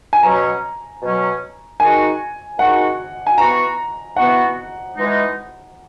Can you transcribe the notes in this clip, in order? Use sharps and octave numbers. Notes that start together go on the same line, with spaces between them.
G#5
B2 F#3 C#4 A#5
B2 F#3 C#4
D#3 G#3 D#4 F#4 G#5
D#3 G#3 D#4 F#4 F#5
G#5
E3 B3 F#4 A#5
E3 B3 F#4 F#5
E3 G#3 D#4